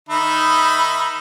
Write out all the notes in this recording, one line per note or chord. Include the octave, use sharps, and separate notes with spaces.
D#3 D#4 E5 B5